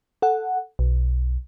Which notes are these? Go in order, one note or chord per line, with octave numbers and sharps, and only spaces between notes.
A4 F#5
B1